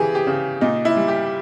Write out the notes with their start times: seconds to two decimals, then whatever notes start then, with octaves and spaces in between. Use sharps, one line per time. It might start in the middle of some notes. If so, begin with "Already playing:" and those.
Already playing: C#3 E3 G4 G#4
0.15 G4
0.27 C#3
0.61 A#2 D#4
0.85 E4
0.96 G3
1.08 G4